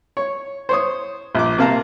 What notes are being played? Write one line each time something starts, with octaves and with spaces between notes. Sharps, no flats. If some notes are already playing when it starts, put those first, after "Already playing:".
C#5
C5 C#5 D#6
A#1 D6
C3 A#3 F5 A5 A#5